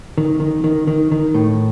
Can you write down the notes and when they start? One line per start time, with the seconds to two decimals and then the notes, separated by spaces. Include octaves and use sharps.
0.18 D#3
0.40 D#3
0.64 D#3
0.87 D#3
1.11 D#3
1.34 A2